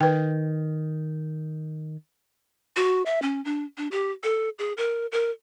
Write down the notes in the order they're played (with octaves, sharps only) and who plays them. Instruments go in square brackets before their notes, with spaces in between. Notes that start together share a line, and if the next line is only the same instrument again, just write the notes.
[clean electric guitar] D#3 [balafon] B4 G5
[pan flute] F#4
E5
C#4
D4
D4
G4
A4
G#4
A#4
A#4